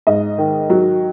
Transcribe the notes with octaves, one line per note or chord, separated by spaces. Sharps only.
G#2 D#5
D#3
F#3